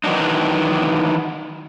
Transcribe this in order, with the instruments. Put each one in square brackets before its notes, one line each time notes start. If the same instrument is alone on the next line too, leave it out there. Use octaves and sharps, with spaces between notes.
[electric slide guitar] D#3 E3 F#3 D4 D#4